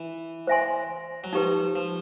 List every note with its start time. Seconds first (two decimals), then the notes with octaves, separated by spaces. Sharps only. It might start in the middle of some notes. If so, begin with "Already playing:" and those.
Already playing: E3
0.47 C5 E5 G#5 C6
1.24 F#3
1.33 F3 D#4 G4 B4
1.76 F3